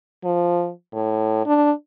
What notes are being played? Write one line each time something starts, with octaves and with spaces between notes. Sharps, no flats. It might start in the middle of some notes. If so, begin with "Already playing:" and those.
F3
A2
D4